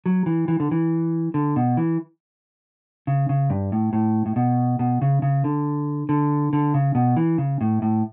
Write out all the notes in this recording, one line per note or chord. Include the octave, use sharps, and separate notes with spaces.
F#3
E3
E3
D3
E3
D3
B2
E3
C#3
C#3
G2
A2
A2
A2
B2
B2
C#3
C#3
D3
D3
D3
C#3
B2
E3
C#3
A2
A2